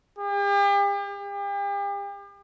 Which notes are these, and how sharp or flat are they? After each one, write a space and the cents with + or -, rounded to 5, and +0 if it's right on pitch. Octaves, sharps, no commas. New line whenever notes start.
G4 +40
G4 +40